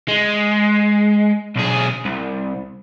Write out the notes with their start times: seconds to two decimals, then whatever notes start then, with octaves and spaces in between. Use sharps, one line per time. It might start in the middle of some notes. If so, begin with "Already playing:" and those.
0.08 G#3
1.56 B1 G#4
2.05 C2